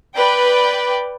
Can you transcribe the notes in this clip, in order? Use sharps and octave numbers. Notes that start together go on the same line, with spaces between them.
B4 D5 G5